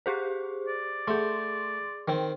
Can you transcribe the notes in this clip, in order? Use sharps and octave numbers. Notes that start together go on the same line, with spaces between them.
G4 G#4 C5
D5
A3 G#4 C6
D#3 C4